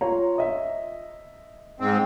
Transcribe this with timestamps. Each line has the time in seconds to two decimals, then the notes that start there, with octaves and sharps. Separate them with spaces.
0.01 F4 C#5 A#5
0.38 D#5 E5
1.80 G#2 C4